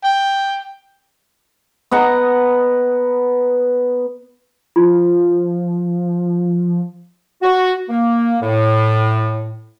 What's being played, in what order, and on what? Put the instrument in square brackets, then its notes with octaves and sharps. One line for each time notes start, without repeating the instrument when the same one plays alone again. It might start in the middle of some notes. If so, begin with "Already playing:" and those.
[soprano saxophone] G5
[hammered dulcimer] B3 D#5 F#5 A#5
[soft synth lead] F3 [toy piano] F4
[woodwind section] F#4
A#3
A2